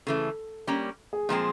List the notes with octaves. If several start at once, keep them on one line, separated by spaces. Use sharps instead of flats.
C#3 E3 A3 A4
G3 A#3 C#4
G#4
A#2 F3 G#3 C4 G#4